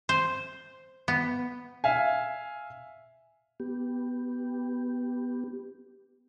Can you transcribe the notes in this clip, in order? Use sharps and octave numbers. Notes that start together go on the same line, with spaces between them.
C5
B3
E5 F5 G#5
B3 G4